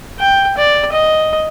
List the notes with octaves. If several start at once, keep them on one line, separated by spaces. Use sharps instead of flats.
G5
D5
D#5